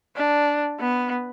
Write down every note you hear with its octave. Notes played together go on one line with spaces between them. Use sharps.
D4
B3